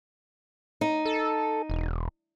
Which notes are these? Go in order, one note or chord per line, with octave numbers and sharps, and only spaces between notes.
D#4
A4
E1